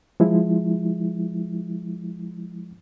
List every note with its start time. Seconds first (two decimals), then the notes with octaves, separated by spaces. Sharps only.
0.20 F3 G#3 E4